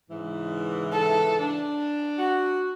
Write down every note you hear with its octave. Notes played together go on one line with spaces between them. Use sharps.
G#2 C#3 E3
A4
D4
F#4